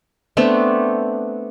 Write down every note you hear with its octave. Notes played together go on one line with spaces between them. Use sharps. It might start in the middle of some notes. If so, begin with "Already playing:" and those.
A3 B3 C4 D4